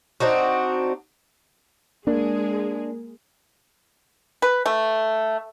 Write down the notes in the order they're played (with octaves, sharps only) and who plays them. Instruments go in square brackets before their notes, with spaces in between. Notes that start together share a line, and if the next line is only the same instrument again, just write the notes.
[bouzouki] C4 D4 D#4 F#4
[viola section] G#3 G#4 [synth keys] A#3 A#4 [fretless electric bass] D4
[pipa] B4
A3